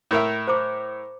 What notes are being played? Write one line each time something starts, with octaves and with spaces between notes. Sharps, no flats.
A2 A#4 E5
C5 A#5 D6